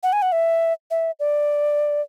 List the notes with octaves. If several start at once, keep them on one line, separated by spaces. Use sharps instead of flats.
F#5
G#5
F#5
E5
E5
D5